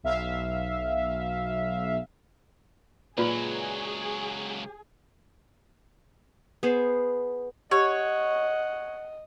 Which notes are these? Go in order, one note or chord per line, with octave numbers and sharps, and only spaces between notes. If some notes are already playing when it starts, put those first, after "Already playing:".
B1 E5 F5
C#2 A#2 F#3 F4 G#4 B4
B3 G#4 C5
G4 C#5 D#5 F#5